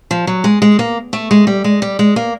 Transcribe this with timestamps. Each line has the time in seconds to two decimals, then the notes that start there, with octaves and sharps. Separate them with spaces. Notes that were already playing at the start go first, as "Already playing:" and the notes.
0.11 F3
0.27 F#3
0.44 G#3
0.62 G#3
0.79 A#3
1.13 A3
1.31 G#3
1.47 G3
1.64 G#3
1.82 G3
1.99 G#3
2.16 A#3